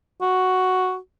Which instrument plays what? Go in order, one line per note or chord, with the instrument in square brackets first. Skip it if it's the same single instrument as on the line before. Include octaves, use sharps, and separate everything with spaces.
[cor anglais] F#4